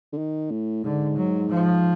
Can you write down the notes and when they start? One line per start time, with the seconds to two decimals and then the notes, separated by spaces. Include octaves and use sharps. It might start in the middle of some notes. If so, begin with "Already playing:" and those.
0.13 D3
0.18 D#3
0.51 A2
0.83 G#2 D3
1.17 F#3
1.50 F3